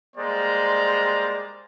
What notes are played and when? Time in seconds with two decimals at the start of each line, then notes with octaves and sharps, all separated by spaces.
0.17 G3 G#3 A#3 C5 D5 A#5